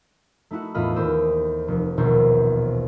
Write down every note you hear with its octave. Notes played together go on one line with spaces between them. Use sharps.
A3 D#4 E4 F#4
E2 A2 F4 D#5 B5 F6
D#2 G4 C5 D#6 E6
F1
E1 A#1 D#2 B2 C5 E6